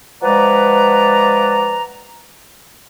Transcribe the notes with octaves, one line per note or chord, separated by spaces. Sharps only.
F3 G#3 B4 D5 F#5 A#5